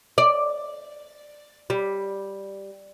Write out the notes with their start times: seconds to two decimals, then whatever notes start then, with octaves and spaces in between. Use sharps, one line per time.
0.18 D5
1.70 G3